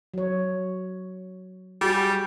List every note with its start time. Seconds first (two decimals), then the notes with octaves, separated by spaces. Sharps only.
0.14 F#3 C#5
1.81 G3 F#4 G#4